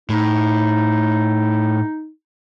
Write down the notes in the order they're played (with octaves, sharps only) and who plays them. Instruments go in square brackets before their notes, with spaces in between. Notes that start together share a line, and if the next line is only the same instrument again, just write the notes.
[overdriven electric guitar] A2 [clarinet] D#4